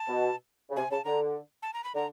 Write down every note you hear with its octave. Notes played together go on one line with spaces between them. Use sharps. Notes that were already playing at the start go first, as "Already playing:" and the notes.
Already playing: A5
B2
C#3
C3 G#5
C#3 A5
D3 A#5
A5
A#5
B5
D3 A#5